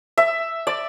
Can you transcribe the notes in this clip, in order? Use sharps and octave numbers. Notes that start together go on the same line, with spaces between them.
E5
D5